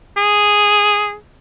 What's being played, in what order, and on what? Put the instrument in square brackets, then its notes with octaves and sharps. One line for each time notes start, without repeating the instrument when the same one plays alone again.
[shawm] G#4